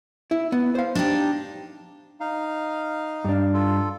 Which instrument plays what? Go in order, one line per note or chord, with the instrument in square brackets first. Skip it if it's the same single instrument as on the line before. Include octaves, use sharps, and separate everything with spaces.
[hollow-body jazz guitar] E4
B3
C5 F5
[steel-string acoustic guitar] D4 D#4 G4
[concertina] D#4 F5
[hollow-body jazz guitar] G2 D4
[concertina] F4 A4